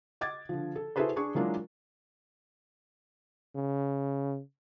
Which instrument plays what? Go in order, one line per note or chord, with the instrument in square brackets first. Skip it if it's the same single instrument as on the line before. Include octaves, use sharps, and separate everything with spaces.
[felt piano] D#5 D6 G#6 A6
D3 F3
A4
E4 F#4 G#4 A4 B4 C5
D4 G#4 C#6
E3 F#3 G#3 A#3 D4 F4
[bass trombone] C#3